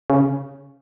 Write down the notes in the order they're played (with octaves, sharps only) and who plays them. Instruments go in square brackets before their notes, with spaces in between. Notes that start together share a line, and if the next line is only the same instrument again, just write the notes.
[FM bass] C#3